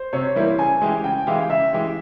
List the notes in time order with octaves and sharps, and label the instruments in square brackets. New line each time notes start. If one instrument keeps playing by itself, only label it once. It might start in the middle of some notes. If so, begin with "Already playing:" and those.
Already playing: [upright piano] C5
[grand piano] C3 [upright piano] C#5
[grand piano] E3 G3 A#3 E4
[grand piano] C#3 [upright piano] G#5
[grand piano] E3 G#3 E4 G4
[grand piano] C#3 [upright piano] G5
[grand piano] E3 G#3 E4 G4 [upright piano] F5
[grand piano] C#3 [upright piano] E5
[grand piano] E3 G#3 E4 G4